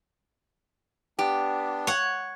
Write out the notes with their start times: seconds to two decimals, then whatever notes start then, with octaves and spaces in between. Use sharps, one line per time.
1.19 B3 D4 G4
1.87 C#5 F#5